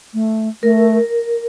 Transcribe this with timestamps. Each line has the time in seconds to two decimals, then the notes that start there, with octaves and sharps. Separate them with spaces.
0.14 A3
0.63 A3 A#4